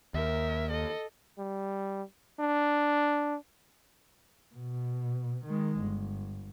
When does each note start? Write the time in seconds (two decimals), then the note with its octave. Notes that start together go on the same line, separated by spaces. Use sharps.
0.14 D#2 A#4 E5
0.71 A4 D#5
1.38 G3
2.39 D4
4.54 B2
5.46 D#3 G#3
5.80 G1